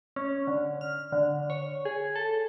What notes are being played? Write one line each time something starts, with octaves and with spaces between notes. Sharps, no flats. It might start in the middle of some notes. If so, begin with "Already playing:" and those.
C#4
D3
F6
D3
C#5
G#4
A4